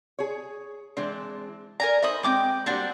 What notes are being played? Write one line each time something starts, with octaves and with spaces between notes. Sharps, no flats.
G#4 C#5
E3 G#3 C4 D4
A#4 D5 G#5 A#5
D#4 C5 D#5 E5 B5 D#6
G#3 C4 G5 D6 G6
G3 A#3 C4 D4 F#4